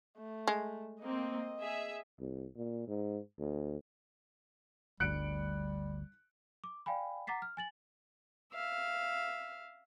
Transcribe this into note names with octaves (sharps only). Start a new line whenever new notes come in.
A3
G#3
A#3 C4 D#5
G#4 E5
C2
A#2
G#2
D2
G1 D2 G2 G3 F#6 C#7 D7
D6
D5 F5 G5 G#5 B5
F#5 A#5 D6 A6 B6 C7
F6
G#5 A6 F#7
E5 F5